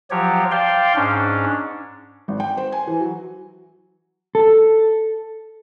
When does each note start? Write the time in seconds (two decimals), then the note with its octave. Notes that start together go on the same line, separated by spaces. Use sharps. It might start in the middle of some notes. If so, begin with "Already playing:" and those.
0.11 F3 F#3 G4 C#5
0.51 C5 D5 F5 G5 C6
0.96 G#2 C#4 D4
2.28 G#1
2.40 G5
2.57 C5
2.72 G#5
2.87 E3
3.00 F#3
4.35 A4